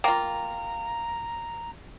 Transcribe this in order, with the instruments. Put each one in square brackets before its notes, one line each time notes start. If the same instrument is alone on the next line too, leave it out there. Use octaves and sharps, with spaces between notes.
[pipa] A#3 F4 [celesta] G5 [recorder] A#5